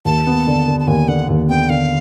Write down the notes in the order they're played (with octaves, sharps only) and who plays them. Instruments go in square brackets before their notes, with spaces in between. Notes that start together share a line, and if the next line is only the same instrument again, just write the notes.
[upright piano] D#2 [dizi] A5
[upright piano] B3
D3
D3
[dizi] A5
[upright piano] D#2 [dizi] G#5
[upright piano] D3 [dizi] F#5
[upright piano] D#2
[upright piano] B3 [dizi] G5
[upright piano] D3 [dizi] F5